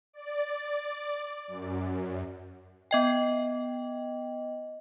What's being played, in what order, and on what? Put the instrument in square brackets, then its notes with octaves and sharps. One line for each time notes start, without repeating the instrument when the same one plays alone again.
[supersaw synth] D5
F#2
[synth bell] B3 D#5 G5